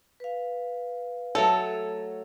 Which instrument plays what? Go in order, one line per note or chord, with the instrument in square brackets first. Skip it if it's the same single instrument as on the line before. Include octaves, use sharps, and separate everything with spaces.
[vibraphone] B4 F5
[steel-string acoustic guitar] F#3 A3 C#5 [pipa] A4